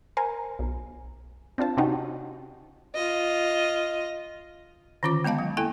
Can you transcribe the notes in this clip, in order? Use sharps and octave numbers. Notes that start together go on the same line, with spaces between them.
A#4 C5 G#5
B1
C4 D4 F4 A5
C3 C4 C#4 D#4 F#4 G4
F4 D#5
D3 D#3 C#4 F4 D6
G#3 B3 D#5 F5 A5
F#3
A#3 E4 A4 G5 G#5